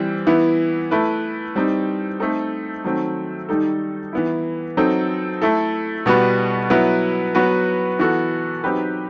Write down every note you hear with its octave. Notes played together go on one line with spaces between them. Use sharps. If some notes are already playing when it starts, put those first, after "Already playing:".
Already playing: E3 G3 C4
E3 B3 E4
A3 E4 B4
G3 C4 D#4
A3 C4 D#4 A4
D#3 F#3 A3 C4
D#3 G3 D#4 A4
E3 B3 E4
F#3 C4 D#4 A4
A3 E4 A4
B2 G3 B3 F#4 B4
F#3 B3 E4 B4
F#3 B3 F#4 B4
E3 B3 F#4 A4
F#3 C4 D#4 G4 B4